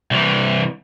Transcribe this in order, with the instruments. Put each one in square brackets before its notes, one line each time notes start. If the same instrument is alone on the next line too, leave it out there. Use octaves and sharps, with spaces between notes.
[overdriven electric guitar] C2 E3